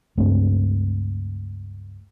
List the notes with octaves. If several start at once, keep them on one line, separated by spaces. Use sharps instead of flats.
C#2 G2 A3 C4